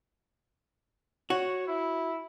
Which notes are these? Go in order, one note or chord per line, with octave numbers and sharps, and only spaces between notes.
F#4 C#5
E4